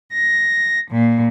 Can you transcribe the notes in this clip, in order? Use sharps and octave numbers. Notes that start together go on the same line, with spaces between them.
A#6
A#2